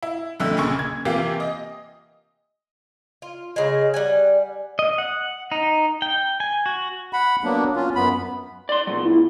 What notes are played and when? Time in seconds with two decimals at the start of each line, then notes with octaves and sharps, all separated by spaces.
0.02 E4
0.40 B1 F2 D3 A3 E6
0.57 F#1 A#2 C#3 C#6
0.79 G#6
1.05 C3 E3 A#3 F4 G4
1.40 D#5
3.22 F4
3.56 C#3 G#3
3.94 G3 F#5 G#5
4.79 D#5
4.98 F#5
5.52 D#4
6.02 G5
6.40 G#5
6.66 F#4
7.13 F#5 B5
7.44 F#3 A#3 B3 D4
7.76 C#4 F4
7.95 F#2 B3 B5
8.69 D5 C6
8.87 A#2 F#3
9.05 E4